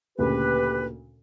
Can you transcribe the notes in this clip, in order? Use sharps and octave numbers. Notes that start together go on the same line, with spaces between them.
D2 A#2 C#3 G4 B4